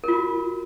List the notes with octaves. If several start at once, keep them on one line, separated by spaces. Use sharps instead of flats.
F4 F#4 A#4